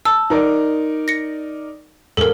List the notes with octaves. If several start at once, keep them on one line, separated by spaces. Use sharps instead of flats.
A5 E6
D#4 A#4 D5
A#6 C#7
E1 A4 A#4